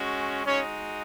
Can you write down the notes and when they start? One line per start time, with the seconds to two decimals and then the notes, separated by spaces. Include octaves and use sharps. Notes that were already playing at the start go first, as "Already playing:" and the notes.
Already playing: G#3 C#4 F#4
0.45 G#3 C#4 D#4 F#4 C#5